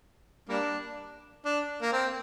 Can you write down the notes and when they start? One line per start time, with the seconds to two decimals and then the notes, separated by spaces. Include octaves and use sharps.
0.49 G3 A#3 D4
1.45 D4
1.82 A#3
1.92 C4